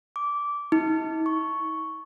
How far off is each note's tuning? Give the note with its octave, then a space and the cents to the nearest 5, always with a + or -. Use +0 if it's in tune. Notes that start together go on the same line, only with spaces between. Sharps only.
D6 -15
D#4 +45
C#6 +0